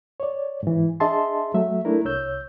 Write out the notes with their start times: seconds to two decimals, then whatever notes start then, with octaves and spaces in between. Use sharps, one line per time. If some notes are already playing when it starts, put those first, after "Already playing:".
0.20 C#5 D5
0.63 G#2 E3
1.00 D4 G#4 D#5 E5 A5 C6
1.54 F#3 A3 E5
1.85 A3 D4 E4 A#4
2.05 C2 C#5 E6 G6